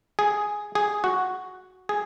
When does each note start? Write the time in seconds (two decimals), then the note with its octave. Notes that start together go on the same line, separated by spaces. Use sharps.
0.19 G#4
0.75 G#4
1.04 F#4
1.89 G#4